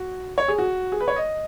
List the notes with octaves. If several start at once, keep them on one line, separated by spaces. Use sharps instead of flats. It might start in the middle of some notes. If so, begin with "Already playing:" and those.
Already playing: F#4
C#5
G#4
F#4
G#4
B4
C#5
D#5